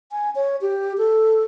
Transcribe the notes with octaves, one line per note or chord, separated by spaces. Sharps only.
G#5
C#5
G4
A4